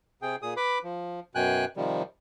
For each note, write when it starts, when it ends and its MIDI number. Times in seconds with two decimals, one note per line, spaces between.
0.22 0.36 48
0.22 0.36 68
0.22 0.36 79
0.42 0.54 46
0.42 0.54 68
0.42 0.54 87
0.57 0.78 71
0.57 0.78 83
0.57 0.78 86
0.83 1.20 53
1.35 1.65 42
1.35 1.65 47
1.35 1.65 79
1.35 1.65 80
1.35 1.65 90
1.77 2.02 48
1.77 2.02 51
1.77 2.02 53
1.77 2.02 55